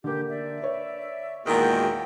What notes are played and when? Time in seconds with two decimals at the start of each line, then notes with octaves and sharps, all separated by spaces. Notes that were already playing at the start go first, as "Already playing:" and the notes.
0.04 D3 A#3 G4
0.29 D5 E5
0.63 B4 C#5
1.46 E2 A#2 D#3 G#3 A#3 F#4 G5